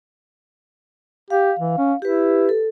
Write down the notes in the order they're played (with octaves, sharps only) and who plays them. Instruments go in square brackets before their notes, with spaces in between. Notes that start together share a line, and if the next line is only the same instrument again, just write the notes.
[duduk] G4 [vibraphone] F5
[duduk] E3
C#4
[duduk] E4 [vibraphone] G4 B4
[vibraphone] A4